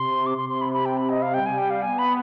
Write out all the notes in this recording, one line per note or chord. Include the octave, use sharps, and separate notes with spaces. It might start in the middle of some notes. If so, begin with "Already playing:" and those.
Already playing: C3 C6
D6
C3 C6
C6
B5
B5
G5
B5
D#5
F5
G3 G5
G#5
G5
F5
B3 G#5
B5